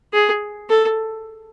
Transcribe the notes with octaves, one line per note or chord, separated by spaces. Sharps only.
G#4
A4